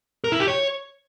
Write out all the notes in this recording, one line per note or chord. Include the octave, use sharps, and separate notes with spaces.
A#4
E4
G4
C#5